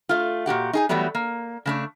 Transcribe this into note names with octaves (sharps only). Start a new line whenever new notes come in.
A3 F4
A#2 F#4 G4 F#5
D#4 G#4 G#5
E3 F#3 G3 A3 B3
A#3
C#3 A3 D4